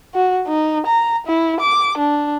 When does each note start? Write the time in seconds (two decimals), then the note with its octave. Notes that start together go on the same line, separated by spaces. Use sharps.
0.14 F#4
0.47 D#4
0.86 A#5
1.27 E4
1.60 D6
1.98 D4